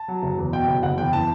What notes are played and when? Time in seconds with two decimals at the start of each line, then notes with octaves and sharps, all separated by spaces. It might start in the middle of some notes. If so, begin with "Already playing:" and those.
Already playing: A5
0.08 F#3
0.23 F#1
0.38 E2
0.53 B2 G5
0.68 F#1
0.83 F#1 F#5
0.98 E2 G5
1.13 E3 A5